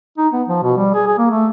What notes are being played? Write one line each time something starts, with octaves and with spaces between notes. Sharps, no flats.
D#4
B3
F3
B2
G3
G#4
G#4
A#3
A3